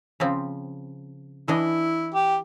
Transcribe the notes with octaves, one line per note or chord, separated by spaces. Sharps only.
C#3 F3 C4
E3 D4 E4 D#5
G4